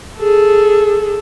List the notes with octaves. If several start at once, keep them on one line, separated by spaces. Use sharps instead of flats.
G#4 A4